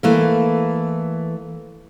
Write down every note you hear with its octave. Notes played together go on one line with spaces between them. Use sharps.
E3 A3 A#3